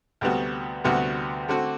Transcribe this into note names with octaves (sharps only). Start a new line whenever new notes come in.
D2 C3 G3 B3 F#4
D2 C3 G3 B3 F#4
D3 A3 C4 F#4